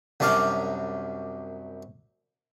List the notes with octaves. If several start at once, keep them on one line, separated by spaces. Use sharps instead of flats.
C2 F#2 D4 D5 F5 D6